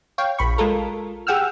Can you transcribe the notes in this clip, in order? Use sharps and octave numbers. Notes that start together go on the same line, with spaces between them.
C#5 F5 G5
A#1 B5 C#6
G#3 F4 A4 A#4
G4 G#4 F#5 G5 E6 F6